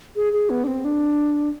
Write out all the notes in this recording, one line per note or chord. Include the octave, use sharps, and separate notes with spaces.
G#4
G#4
B3
D4
C4
D4